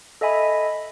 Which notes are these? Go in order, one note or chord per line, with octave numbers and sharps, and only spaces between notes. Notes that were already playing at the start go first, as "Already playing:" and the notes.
A4 D#5 E5 G#5 B5